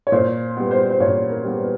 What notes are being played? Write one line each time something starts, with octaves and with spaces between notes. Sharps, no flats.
C#5
A#2 C5
G3 B3
C5
C5
A#2 C#5
A#4
G3 B3
B4